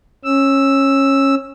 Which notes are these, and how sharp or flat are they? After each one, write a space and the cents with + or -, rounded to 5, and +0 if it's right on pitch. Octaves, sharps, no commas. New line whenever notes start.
C#4 -20 E6 +0